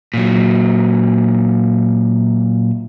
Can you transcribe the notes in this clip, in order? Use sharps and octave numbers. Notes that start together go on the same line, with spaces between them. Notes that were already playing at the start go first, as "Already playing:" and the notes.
A#2 F#3